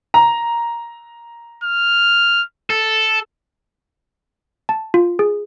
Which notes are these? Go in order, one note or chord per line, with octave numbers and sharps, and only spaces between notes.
A#5
F6
A4
A5
F4
G#4